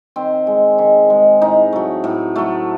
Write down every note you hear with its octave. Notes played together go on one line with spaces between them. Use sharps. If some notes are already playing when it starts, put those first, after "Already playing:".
D#3 C4
G#3
D#3
G#3
A2 D#4
F#3 A3
A2
F#3 A3